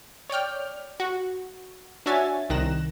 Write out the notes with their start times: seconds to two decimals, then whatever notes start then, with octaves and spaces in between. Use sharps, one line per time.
0.30 C#5 D5 G5 F6
1.00 F#4
2.06 D4 F#4 C#5 E5 G#5 A6
2.50 C2 D#3 F#6 A#6 E7